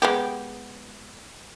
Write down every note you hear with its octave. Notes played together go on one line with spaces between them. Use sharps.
G#3 B3 G4